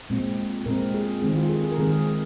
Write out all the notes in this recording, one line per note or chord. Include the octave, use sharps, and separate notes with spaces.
A#2 G#3 C4
A#2 G#3 C4 A#4
G#4
D#3 G#3 C4 G#4
F4
G#4
G#4
A#4
D#3 G#3 C4 G#4